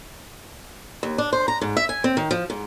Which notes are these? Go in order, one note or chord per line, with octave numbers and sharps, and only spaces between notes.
D#2
D4
C5
A#5
G#2
E5
G#5
C4
D#3
F3
G#2